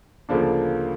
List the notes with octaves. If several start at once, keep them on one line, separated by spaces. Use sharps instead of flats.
D2 C#3 F3 A#3 D4